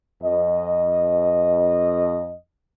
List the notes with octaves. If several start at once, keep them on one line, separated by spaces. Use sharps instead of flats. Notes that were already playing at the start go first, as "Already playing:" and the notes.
F2 D#5